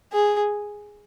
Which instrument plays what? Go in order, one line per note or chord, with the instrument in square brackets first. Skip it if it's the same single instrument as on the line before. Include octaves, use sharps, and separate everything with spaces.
[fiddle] G#4